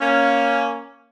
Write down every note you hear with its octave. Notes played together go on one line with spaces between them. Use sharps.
A#3 C#4